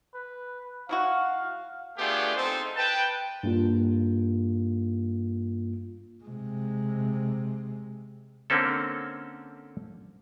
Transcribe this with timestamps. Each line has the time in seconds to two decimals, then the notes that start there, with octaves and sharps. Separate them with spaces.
0.15 B4
0.89 F#3 E4 F#4 F5
1.98 A3 B3 D4 F4 G4 G#4
2.36 C4 D#4 A4 C5
2.77 B4 G5 A5
3.43 G2 A#3 F4
6.24 C3 G#3
8.50 D3 A#3 C4 C#4 A4